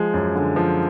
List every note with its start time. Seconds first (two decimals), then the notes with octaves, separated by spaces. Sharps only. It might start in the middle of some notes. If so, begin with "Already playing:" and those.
Already playing: F3 G#3
0.14 F#2
0.36 D3
0.56 F3